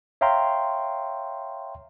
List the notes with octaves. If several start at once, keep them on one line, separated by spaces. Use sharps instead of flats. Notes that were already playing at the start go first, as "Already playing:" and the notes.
C#5 E5 F5 G5 A#5 C6